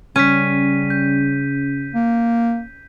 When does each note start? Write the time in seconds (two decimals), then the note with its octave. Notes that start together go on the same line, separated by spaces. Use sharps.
0.16 C#3 G3 C#4 B6 D#7
0.90 G6
1.95 A#3